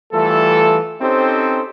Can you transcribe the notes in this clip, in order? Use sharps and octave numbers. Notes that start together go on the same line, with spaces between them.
E3 G3 A3 F4 A4
C4 C#4 D#4 G4 A4 C5